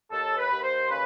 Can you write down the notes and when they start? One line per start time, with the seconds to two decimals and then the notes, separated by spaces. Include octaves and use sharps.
0.11 D#2 A4
0.38 B4
0.51 D#2
0.63 C5
0.90 C#3 B4